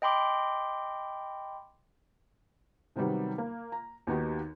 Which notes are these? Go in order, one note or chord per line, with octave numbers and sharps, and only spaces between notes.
D#5 G5 B5 C6 D6
C3 D#3 F#3 G3 B3
A#3
A#5
D#2 D#3 B3 D#4 F#4 G4